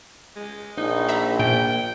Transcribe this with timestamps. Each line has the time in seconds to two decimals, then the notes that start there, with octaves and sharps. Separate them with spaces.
0.36 G#3
0.78 A#1 D#4
1.08 E5 A#5 B5
1.39 A#2 G5